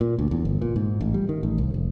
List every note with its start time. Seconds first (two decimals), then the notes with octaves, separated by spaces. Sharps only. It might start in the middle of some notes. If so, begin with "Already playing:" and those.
0.01 A#2
0.19 D2
0.31 E2
0.45 G1
0.62 A#2
0.76 G#2
1.01 A1
1.14 G3
1.29 D#3
1.43 A1
1.58 C2
1.74 F1